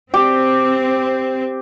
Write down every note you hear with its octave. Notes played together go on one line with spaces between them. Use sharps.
C4 G4